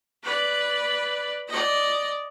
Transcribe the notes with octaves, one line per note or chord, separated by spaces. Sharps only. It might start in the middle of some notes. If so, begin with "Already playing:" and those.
B4 D5
D5 D#5